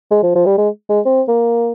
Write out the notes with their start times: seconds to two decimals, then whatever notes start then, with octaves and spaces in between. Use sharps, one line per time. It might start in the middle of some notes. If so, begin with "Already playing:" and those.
0.11 G#3
0.23 F3
0.35 F3
0.46 G3
0.58 G#3
0.89 G#3
1.06 C4
1.28 A#3